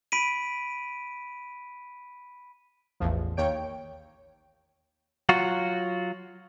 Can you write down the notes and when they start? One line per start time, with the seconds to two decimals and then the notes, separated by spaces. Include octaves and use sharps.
0.12 B5 B6 D7 D#7
3.00 A1 E2 F3
3.37 D#2 C#5 G5 D7
5.29 F#3 F4 F#4